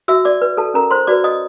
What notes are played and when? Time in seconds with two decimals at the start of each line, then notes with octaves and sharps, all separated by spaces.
0.08 F#4 E5 E6
0.25 D5 D6
0.42 B4
0.57 A4 A5
0.74 C#4 A#4 A#5
0.91 C5 C6
1.07 F#4 B4 D5 D6
1.24 D#5 D#6